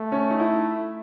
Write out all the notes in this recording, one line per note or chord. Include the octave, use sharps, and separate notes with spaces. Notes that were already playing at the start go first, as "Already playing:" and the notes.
Already playing: A3
C#4
D#4
E4